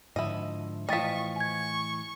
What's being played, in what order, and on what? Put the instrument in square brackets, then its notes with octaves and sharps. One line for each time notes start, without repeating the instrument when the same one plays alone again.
[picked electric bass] G#2 D3 F3 [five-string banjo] E4 D#5
[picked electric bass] A2 E3 [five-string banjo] F3 D#5 [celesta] G5 A6 B6 [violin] C#6
[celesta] G#5 G#6 [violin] C#6